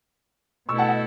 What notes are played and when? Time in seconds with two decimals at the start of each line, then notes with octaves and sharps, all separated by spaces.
0.69 B2 A3 E4 A4 C#6 E6
0.78 F#5 A5
0.88 D#5 F#5